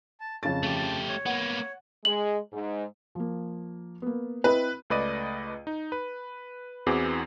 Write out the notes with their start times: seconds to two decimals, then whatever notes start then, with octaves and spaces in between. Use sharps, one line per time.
0.20 A5
0.43 F2 C#3 A5 A6
0.63 A3 G4
1.09 C#5
1.26 A#3 B3 F#5
2.05 G#3 F#7
2.53 G#2
3.15 F3 A#3
4.02 A#3 B3
4.44 C4 E4 B4 D#5
4.90 C#2 A3 B4 D5 D#5 D#7
5.67 D#4
5.92 B4
6.87 E2 E3 C4 F#4 G#4 D6